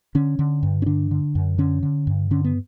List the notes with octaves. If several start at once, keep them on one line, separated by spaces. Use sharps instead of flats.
D3 C#4
D3
G2
C#4
D3 D4
D3
F#2
D3 C#4
D3
G2
D3 C#4
B3